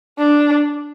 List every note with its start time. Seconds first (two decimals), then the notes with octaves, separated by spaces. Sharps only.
0.19 D4